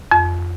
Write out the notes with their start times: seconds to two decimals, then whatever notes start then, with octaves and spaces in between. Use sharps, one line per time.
0.11 F2